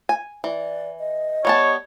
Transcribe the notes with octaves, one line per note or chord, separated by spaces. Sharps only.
G#5
E3 D5
D#5
G3 B3 C#5 A5